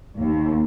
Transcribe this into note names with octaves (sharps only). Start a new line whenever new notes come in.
D#2